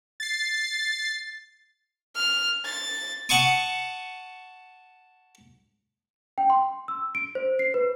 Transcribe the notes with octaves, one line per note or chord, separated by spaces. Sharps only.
A6 C7
F6
A6
F#5 A5 C#6 D#6
G5
C6
E6
D7
C5
C7
B4